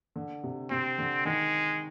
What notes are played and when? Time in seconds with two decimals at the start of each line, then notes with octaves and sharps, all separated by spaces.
0.16 D3
0.43 C3
0.70 C3 C4
0.98 D3
1.25 D#3 G#3